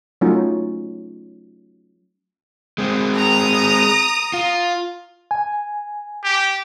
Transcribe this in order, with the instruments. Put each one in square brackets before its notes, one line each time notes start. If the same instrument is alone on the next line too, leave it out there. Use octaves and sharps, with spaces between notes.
[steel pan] F#3 A3 C#4 D#4 F4
[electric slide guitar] G#3 C4
[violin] A#5 D#6
[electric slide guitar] F4
[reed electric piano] G#5
[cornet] G4